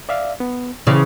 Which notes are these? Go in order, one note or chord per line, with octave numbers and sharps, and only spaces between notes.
D5 E5 F5
B3
C#3 E3 C5 D5